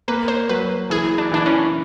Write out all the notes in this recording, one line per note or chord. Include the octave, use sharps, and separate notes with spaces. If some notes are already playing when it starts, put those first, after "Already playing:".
A#3 B4
C5
F#3 B4
E3 G#4
D4
E3 D4
C#4